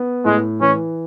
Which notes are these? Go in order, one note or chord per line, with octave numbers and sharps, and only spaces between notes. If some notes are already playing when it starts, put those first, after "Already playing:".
Already playing: B3
A2 G#3
E3 C#4